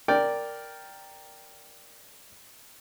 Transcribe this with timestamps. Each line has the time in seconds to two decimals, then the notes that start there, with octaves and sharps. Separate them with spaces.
0.08 A#4 D5 G5